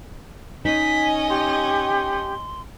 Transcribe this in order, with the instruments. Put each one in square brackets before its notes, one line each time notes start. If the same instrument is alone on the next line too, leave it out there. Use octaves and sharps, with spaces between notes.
[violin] C#4 D#5 [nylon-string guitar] D#4 [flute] G#5 [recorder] B6
[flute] G4 [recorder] C6